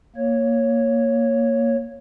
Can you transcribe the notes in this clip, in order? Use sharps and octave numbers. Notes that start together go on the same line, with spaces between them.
A#3 C#5